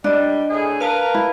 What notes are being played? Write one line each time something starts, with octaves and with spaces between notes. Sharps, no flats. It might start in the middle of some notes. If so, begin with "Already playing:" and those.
G3 D4 D5 D#5
A2 G#4
A#4 B4 F5 A5
E4